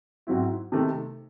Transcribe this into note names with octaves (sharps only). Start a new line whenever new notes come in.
G#2 F#3 C4 E4
C3 D#3 A3